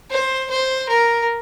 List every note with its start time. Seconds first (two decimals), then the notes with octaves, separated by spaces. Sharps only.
0.10 C5
0.50 C5
0.89 A#4